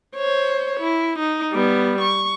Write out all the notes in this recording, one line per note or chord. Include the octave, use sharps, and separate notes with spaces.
C5 C#5
E4
D#4
G3 B3
C#6